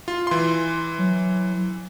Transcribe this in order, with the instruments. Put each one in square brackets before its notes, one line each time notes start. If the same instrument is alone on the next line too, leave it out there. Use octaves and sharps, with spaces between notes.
[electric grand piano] F4
E3 C6
[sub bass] F#3